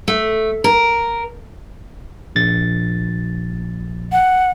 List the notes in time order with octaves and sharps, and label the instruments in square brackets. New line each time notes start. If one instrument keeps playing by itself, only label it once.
[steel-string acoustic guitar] A3
A#4
[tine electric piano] A#1 A6
[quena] F#5